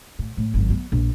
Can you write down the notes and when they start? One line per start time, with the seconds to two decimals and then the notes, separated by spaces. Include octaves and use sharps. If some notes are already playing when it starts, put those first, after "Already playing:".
0.19 A2
0.37 A2
0.54 G#1 F#2
0.70 B3
0.92 A#1